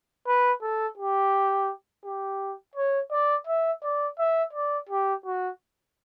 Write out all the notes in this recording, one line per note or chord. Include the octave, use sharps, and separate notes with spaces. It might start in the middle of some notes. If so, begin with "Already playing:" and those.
B4
A4
G4
G4
C#5
D5
E5
D5
E5
D5
G4
F#4